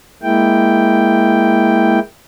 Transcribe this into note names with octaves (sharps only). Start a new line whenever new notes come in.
G#3 A#3 E4 G5